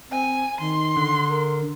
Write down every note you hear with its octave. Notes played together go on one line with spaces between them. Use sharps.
C4 G#5
D#3 C6
D3
A#4